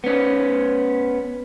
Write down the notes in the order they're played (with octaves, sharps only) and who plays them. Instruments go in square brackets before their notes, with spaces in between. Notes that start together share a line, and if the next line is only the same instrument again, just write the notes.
[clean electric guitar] B3 C#4